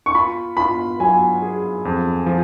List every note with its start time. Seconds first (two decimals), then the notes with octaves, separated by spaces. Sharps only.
0.06 C#6
0.15 F4 B5
0.57 F4 B5
1.00 F#3 G#5
1.42 G#4
1.85 F2
2.26 F3